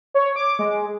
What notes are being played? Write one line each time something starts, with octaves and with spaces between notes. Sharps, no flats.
C#5
D6
G#3